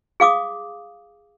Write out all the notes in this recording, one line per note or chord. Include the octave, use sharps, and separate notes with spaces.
G#4 F5 D6 D#6